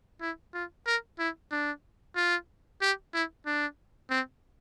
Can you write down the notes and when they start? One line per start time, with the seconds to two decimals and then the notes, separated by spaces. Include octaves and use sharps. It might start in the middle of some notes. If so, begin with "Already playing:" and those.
0.21 E4
0.54 F4
0.86 A#4
1.19 E4
1.51 D4
2.16 F4
2.81 G4
3.13 E4
3.46 D4
4.10 C4